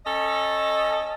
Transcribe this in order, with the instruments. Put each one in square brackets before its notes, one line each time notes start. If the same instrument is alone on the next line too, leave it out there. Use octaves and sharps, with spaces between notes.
[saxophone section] C#4 A4 D#5